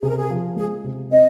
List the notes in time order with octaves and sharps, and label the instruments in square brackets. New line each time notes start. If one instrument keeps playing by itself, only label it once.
[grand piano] C3 [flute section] G#4
[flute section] A#4
G#4
[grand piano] F3
[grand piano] G#3 [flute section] G#4
[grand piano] C3
[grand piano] C4 [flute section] D#5